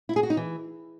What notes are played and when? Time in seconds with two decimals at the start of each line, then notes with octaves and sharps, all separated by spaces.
0.09 E4
0.16 G#4
0.23 F#4
0.30 D#4
0.37 E3